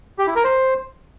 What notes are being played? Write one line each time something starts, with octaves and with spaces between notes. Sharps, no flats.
G4
E4
A#4
C5